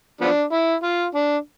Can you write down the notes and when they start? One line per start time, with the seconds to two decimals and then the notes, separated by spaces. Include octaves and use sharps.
0.21 F3 B3 D4
0.52 E4
0.83 F4
1.15 D4